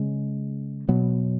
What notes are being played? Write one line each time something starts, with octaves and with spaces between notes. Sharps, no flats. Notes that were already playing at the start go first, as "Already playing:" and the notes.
Already playing: C#3 G#3 C#4
B2 F#3 B3